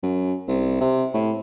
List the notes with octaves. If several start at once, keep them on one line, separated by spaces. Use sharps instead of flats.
F#2
C2
C3
A2